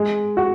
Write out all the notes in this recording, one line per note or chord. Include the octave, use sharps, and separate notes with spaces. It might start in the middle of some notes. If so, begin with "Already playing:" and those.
Already playing: G#3
F#4